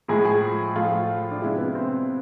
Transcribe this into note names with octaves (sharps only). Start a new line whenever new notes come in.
A2 F3 G#3 G#4
G#4
A2 F3 A3 F4
D4
C3 G#3 E4
B3
C4